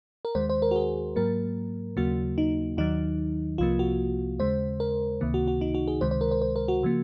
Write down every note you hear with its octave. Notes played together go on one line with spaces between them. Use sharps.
A#4
D#2 D#3 G#3 C5
C5
A#4
F#4
G#4
G#2 F#3 A#3 A#4
D#2 C#3 F#3 A#3 F#4
D#4
D#2 D#3 F#3 D#4
C2 C3 F3 A#3 F4
F#4
D#2 C#3 G#3 C5
A#4
C#2 C3 D#3 A#3
F#4
F#4
D#4
F#4
G#4
C#2 C3 D#3 G#3 C5
C5
A#4
C5
C5
A#4
F#4
C#3 F3 A#3